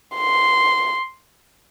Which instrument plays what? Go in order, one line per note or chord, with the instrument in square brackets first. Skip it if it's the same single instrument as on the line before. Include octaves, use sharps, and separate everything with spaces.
[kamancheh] C6